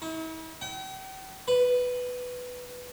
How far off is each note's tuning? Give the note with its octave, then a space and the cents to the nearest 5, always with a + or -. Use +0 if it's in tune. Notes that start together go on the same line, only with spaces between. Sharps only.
E4 -45
G5 -45
B4 +5